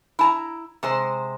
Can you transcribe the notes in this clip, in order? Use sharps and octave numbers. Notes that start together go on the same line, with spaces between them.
E4 A5 A#5
C3 G#3 C5